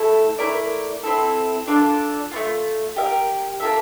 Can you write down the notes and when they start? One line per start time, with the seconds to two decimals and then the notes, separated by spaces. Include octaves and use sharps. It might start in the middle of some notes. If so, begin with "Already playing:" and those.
Already playing: A3 E4 A4
0.38 A3 E4 A#4 D5
1.03 C4 E4 A4
1.67 D4 F4 A4 D5
2.31 A3 C4 F4
2.96 G4 A#4 E5 G5
3.60 A#3 F4 A4 E5